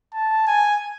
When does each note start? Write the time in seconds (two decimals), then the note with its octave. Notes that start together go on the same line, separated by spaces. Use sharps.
0.14 A5
0.47 G#5